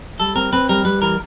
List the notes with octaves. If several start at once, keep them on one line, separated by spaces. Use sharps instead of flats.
G3 A4
C4 A#4
C4 B4
G3 A#4
G3 B4
E3 A#4